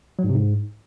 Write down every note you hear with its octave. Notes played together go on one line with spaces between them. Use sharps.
F#3
G#2
C3
G#2